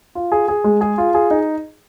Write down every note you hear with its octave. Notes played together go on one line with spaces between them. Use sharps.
F4
G#4
G#4
G#3
G#4
F4
G#4
D#4